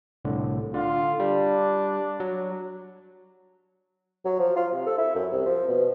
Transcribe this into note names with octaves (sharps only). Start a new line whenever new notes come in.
C2 A2 D3
D3 F4
G3 D4
F#3
F#3
F3
F4
C3
A4
E4
F#2
C2
F3
B2